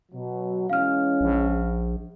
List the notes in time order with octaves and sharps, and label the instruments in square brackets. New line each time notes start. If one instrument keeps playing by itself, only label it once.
[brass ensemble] B2 F#3
[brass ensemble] E3 G#3 C#4 [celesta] F5 F6
[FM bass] A#1